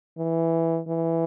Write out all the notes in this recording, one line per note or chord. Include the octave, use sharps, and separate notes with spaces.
E3
E3